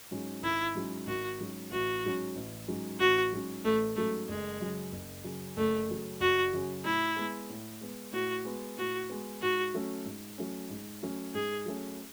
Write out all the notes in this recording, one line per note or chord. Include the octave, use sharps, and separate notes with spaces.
G#2 F#3 C#4
G#1 E4
G#2 F#3 C#4
G#1 F#4
G#2 F#3 C#4
A1 F#4
G#2 F#3 C#4
A1
G#2 F#3 C#4
A1 F#4
G#2 F#3 C#4
A1 A3
G#2 F#3 A3 C#4
F#1 G#3
F#2 C#3 F#3
F#1
F#2 C#3 F#3
F#1 A3
F#2 C#3 F#3
F#1 F#4
F#2 C#3 F#3
A2 E4
G#3 B3
A2
G#3 B3
A2 F#4
G#3 B3
A2 F#4
G#3 B3
G#2 F#4
F#3 A3 C#4
G#2
F#3 A3 C#4
G#2
F#3 A3 C#4
G#2 G#4
F#3 A3 C#4